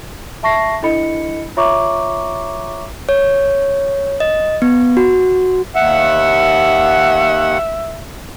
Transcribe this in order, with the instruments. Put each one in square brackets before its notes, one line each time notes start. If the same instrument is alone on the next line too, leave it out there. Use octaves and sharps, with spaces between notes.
[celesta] E5 A5 C#6 A#6 C7
D4 E4 A4 D#5 B5 C#7
F4 C#5 E5 A#5 C#6 D6
[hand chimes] C#5
D#5
B3
F#4
[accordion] D#2 F#5 [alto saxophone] E5